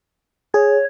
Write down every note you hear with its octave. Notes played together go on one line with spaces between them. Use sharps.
G#4 C#5